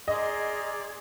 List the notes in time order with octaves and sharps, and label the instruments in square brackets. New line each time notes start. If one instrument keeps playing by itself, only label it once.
[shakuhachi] G#4 [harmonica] A#4 D5 C6 [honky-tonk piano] D#5